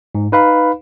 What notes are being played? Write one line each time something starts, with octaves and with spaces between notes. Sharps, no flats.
G#2
D#4 B4 F5 B5